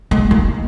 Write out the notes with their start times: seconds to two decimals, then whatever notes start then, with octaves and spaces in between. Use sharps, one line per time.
0.11 G#3
0.31 A#3